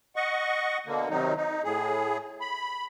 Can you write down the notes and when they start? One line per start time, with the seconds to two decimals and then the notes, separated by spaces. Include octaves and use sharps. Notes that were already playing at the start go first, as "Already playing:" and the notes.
0.16 D#5 F#5 C#6
0.86 B2 D3 A#3
1.10 C3 D#3 F#3 D#4
1.37 D#4
1.64 A2 G#4
2.41 B5